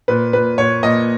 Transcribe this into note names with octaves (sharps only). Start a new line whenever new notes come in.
A#2 B4
A#2 B4
A#2 C#5
A#2 D#5